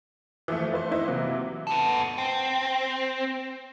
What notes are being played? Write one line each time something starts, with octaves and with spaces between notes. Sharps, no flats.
E3 F3 A3
A3 B4 C5
D#4 E4 B4 C5
C3 E3 F#3 A#3
B3 A4
C4